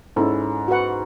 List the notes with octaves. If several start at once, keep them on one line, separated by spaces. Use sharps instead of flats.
G#2 C#4 E4 A4
F#4 B4 F#5